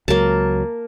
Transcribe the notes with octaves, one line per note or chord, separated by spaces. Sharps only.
C#2 F#3 A#3 A5